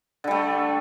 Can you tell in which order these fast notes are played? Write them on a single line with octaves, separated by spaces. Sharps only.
D3 G3 A3